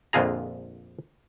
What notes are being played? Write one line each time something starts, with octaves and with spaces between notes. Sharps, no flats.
A#1 F2 D3 F4 G#4 A#5